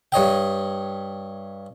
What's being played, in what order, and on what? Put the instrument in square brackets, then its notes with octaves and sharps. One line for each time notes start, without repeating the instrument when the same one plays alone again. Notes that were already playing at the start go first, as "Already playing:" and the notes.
[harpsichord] G2 C#5 D#5 G5